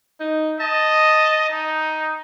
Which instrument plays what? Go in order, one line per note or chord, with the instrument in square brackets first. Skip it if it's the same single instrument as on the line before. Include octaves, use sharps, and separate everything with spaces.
[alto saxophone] D#4
[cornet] D#5 [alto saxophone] A5
[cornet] D#4